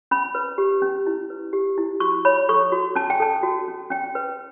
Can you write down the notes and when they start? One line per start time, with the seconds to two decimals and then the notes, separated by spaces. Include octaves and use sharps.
0.11 C#4 B5
0.35 B4
0.58 G4
0.82 C#4
1.07 E4
1.30 B4
1.53 G4
1.78 E4
2.00 F#4 C#6
2.25 C#5 B5
2.49 A4 C#6
2.72 F#4
2.95 C#4 A5
3.10 G5
3.20 A4 A5
3.43 F#4
3.68 C#4
3.90 C#4 G5
4.15 B4